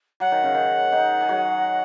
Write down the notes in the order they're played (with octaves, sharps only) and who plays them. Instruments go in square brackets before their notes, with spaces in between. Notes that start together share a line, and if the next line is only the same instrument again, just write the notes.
[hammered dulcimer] F#3 [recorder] F#5
[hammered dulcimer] D#3
C#3
D#3
D#3 D#4
G#4
F#3 F#4